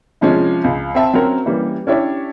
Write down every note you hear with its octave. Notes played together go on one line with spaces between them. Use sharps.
C3 F3 G#3 C#4
C#2
C4 E5 A5
F#3 C4 C#4 A#4
E3 G3 A#3 C#4
C#4 D4 E4 G4 C#5